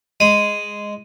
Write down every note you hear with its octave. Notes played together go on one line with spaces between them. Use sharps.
G#3 D#7